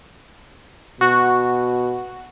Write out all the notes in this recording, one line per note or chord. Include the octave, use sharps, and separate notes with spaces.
B2 F#4